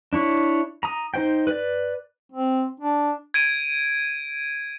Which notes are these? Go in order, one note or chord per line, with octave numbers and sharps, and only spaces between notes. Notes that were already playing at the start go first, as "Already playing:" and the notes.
D4 E4 C#5
A#5 D#6
D#4 C5 G5
B4 D5
C4
D4
G#6 D7 D#7